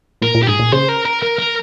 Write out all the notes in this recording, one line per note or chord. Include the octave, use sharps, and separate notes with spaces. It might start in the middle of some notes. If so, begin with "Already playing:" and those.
A#2 A#4
A#2
G4
G#2 G#4
A#2
C#3 C5
A#4
A#4
A#4
A#4